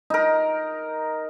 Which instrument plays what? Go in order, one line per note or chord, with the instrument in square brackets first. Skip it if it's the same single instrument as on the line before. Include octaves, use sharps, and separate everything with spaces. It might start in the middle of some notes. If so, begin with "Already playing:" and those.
[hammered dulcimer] D#4 A#4